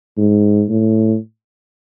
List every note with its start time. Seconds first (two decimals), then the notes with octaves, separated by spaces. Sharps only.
0.17 G#2
0.69 A2